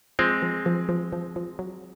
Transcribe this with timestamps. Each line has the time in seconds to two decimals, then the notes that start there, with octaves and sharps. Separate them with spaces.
0.19 F3 G#3 C4
0.42 F3
0.66 F3
0.89 F3
1.13 F3
1.36 F3
1.59 F#3